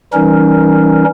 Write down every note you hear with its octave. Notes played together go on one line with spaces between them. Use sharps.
E3 G3 C#4 D#4 A#4